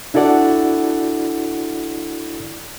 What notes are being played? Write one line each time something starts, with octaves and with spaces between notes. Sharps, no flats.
D4 E4 F#4 A4 D5 F#5